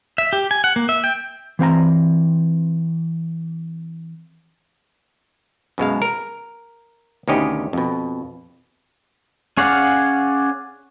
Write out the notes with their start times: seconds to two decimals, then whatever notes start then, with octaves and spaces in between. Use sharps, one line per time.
0.18 E5
0.33 G4
0.51 G#5
0.64 F#5
0.76 A#3
0.89 E5
1.04 G5
1.59 E3 C4 F#5 A#5
5.78 F#2 B2 G#3 F5
6.02 A#4
7.28 D2 B2 D#3 C#4 G4 D#5
7.73 F2 B2
9.57 C#4 G#4 D5 F5 F#5